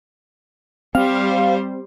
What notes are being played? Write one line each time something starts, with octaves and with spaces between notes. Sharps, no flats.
G3 C4 C5 F5